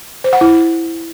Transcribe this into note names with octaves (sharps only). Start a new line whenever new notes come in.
C5
F#5
E4